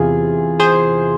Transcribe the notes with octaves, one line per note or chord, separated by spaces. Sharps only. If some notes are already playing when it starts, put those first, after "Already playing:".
Already playing: E2 C3 E3 F4 G#4
G#4 C5